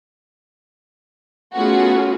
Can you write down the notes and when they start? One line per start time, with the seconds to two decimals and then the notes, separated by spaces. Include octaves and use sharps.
1.55 A3 B3 C#4 F4 F#4 G#4